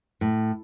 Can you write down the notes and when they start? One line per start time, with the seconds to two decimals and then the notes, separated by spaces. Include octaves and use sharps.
0.21 A2